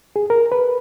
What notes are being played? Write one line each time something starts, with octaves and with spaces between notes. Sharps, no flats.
G#4
A#4
B4